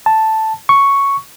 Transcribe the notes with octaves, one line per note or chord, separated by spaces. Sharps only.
A5
C#6